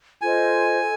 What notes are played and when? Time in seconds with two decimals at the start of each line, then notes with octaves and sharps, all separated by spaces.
0.21 F4 A4 C5 D#5 G#5
0.81 A4